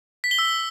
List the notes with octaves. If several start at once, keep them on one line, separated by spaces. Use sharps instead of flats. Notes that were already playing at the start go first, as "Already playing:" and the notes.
B6
G7
E6